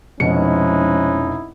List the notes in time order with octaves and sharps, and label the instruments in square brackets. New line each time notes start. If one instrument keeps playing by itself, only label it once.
[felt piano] F1 B2 C#7 [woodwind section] F3 G#3 [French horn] C#4 [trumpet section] D#4 E4